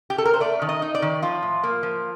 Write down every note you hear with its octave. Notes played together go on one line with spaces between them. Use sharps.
G4
A4
A#4
C5
A3 D5
D#3
D#5
D#4
D5
D#3
F3 F4
A2
A#3
F3